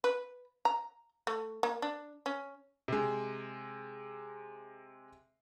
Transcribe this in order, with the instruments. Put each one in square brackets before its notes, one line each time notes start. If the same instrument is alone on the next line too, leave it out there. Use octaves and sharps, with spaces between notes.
[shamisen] B4
A#5
A3
A#3
D4
C#4
[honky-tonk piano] C3 G#3